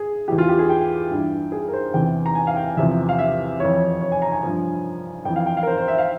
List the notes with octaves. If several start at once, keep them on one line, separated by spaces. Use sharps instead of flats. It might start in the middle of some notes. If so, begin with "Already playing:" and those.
Already playing: G#4
E2 E3 G4
F4
G4
G#4
G5
G2 E3
G#4
A#4
C5
E2 C3 E3 G5
A#5
G#5
F5
G5
E2 C3 F3 E5
F5
E5
F2 E3 C#5
C#5
G#5
A#5
G#5
G2 F3
F2 E3 G5
F5
G5
F5
A#4
C5
C5
E5
F5